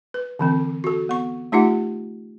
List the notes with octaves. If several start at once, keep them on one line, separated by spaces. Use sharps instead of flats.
B4
D3 E3 C4
F#4 A4
B3 C#6
A3 D#4 F4 G4 F#5